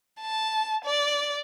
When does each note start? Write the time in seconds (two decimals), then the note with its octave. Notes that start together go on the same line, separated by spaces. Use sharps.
0.20 A5
0.85 D5